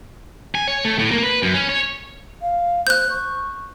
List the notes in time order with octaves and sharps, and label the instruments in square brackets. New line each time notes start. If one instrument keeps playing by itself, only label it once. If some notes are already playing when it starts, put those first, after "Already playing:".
[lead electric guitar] G#5
C#5
A3
A2
A#3
B4
F#2
C#4
C#5
[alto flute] F5
[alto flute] C5 [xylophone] F#6 G6
[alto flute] C#6